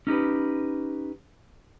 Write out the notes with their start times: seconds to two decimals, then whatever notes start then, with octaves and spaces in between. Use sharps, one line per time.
0.07 C#4 D#4 G4 B4